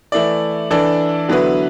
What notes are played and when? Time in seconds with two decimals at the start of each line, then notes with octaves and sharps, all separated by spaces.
0.12 E3 A3 E4 D5
0.71 E3 D4 A4 D5
1.29 D3 F#3 B3 E4 B4